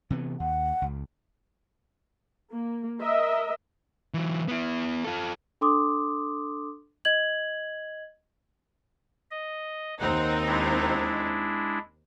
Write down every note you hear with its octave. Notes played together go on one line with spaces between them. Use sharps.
C3 E3 B3
D#2 F#5
C#2
A#3
A#4 D#5 E5
E3 F#3
B3 E4
F4 A4
D4 A4 C6 D6 D#6
D#5 G#6 F#7
D#5
D#2 C4 D#4 F#5
G#3 D4 E4